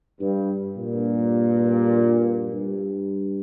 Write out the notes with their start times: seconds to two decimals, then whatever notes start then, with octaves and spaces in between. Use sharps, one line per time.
0.20 G2
0.77 G2 A#2
2.51 G2